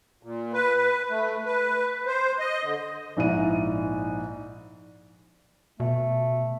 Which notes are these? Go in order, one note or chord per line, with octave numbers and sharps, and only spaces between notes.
A#2
B4
B4
A3
B4
C5
D#5
D3
A#1 G#2 E4 D#7
B2 A3